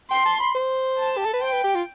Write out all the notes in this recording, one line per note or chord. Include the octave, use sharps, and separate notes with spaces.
G5 C6
A5
B5
C5
A5
G4
A4
B4
C5 G5
B4
G4
F4